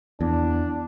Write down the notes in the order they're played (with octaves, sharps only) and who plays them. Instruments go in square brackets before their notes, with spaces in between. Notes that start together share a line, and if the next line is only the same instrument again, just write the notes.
[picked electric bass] E2 [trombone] D4